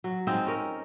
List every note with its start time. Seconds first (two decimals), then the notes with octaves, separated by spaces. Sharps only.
0.04 F#3
0.27 G#3 C4 D#4 F4
0.46 C#4 A#4